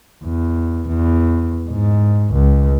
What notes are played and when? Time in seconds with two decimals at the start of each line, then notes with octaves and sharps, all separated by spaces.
0.24 E2
0.88 E2
1.69 G#2
2.34 C#2